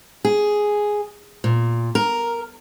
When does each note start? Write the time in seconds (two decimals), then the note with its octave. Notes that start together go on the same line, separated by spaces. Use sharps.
0.25 G#4
1.44 A#2
1.95 A#4